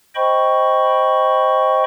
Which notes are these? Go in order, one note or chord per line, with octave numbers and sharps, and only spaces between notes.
C5 D#5 G5 B5 C#6